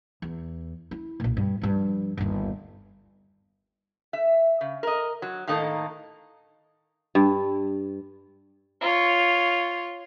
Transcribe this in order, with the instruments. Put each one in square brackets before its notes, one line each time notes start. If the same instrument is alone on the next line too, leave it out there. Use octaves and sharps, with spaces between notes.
[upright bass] E2
E4
B1 A#2
G2
G2 F3
G1 D#2
[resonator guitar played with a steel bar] E5
C#3
A#4 D#5
F#3
A2 D#3 A#3 D#4 A4
[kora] G2
[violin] F4 C#5